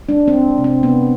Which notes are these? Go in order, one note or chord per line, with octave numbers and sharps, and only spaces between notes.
G#3 D4
C4
G#3
C3
C4
C3 B3